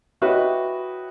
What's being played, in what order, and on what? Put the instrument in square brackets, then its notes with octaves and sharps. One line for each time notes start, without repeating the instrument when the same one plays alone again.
[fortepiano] E4 F#4 G4 B4 C#5 D#5